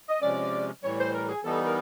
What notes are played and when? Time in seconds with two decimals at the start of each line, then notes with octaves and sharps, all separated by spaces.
0.09 D#5
0.22 C3 F3 G#3 C#4 D5
0.83 A2 E3 G3 C#5
0.99 C5
1.14 A#4
1.29 G#4
1.44 E3 G3 B3 D#4 A4
1.66 A#4